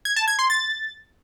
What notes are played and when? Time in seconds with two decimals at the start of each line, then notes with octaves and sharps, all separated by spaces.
0.05 G#6
0.16 A5
0.28 G#6
0.39 C6
0.50 A6